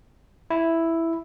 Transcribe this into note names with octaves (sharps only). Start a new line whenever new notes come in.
E4